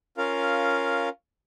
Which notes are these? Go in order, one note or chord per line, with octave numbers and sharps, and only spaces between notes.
C#4 F4 A#4 F5